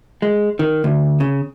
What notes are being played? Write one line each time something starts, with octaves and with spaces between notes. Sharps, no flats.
G#3
D#3
D2
C#3